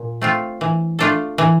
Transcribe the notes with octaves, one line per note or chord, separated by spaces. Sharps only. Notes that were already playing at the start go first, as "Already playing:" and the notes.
Already playing: A#2
A3 C4 F4
E3
A3 D4 F4 A4
E3